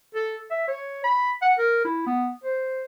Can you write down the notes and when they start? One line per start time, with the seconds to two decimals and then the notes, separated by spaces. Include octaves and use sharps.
0.15 A4
0.51 E5
0.68 C#5
1.04 B5
1.42 F#5
1.58 A#4
1.85 E4
2.07 B3
2.44 C5